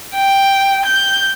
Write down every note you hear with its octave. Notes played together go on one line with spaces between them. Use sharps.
G5
G6